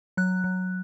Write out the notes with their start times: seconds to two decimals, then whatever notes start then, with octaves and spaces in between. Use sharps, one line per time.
0.17 F#3 F#6
0.44 F#3